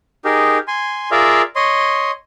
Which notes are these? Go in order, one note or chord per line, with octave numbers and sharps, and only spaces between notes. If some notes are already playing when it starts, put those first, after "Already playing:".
D#4 G4 G#4 A#4
G#5 C6
F4 G#4 A#4 D5 E5 F5
C#5 D#5 C6